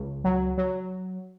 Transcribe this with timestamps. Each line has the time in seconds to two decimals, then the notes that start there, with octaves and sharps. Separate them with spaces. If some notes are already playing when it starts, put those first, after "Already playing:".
Already playing: C#2
0.24 F#3
0.58 F#3